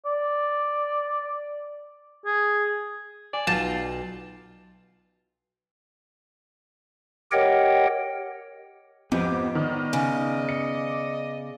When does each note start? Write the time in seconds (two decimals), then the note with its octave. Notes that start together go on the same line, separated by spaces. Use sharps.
0.05 D5
2.26 G#4
3.33 D5 G#5
3.47 B1 F4 A5 G6 A#6
7.32 G4 A#4 C#5 D#5 F#5 G5
9.12 F2 G#2 B3 G4
9.55 D#3 D5 D#5
9.93 C#3
10.49 C#7